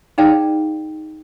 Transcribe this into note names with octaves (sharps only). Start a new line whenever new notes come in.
D#4 G#4 D5 F5 G5 A5